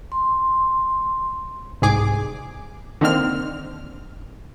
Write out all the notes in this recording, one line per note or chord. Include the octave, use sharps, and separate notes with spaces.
C6
C2 G#2 G#4 D6
D3 D#3 A#3 C4 F6